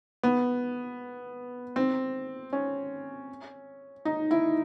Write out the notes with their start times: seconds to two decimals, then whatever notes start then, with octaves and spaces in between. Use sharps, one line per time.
0.23 B3
1.76 C4
2.53 C#4
4.05 D#4
4.31 E4